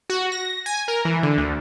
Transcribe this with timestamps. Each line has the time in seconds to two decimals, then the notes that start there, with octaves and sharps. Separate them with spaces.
0.10 F#4
0.32 A#6
0.66 G#5
0.88 A#4
1.05 E3
1.23 D3
1.37 D2